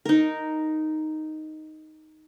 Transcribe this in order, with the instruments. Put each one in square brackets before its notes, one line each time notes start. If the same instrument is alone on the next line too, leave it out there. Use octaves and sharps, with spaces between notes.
[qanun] D#4 A#4